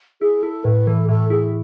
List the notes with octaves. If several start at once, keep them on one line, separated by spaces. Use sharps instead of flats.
E4 G#4
E4 A4
A2 B4
E3 A4
A2 A4
E4 G#4